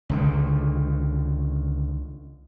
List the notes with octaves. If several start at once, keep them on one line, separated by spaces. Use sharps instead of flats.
C#2 D3 D#3